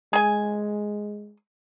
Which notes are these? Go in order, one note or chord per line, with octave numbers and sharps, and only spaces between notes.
G#3 G#4 G#5